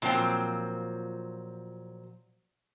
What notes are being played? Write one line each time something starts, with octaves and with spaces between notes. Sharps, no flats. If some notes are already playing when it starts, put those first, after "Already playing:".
A#2 F3 F#3 C4 G5